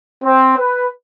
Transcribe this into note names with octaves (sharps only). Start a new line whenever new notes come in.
C4
B4